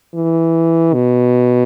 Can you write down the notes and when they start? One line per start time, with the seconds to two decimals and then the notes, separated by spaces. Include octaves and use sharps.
0.14 E3
0.93 B2